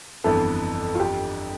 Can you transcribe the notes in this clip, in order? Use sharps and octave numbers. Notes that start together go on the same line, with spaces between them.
G1 F2 E3 B3 A4
F4
G4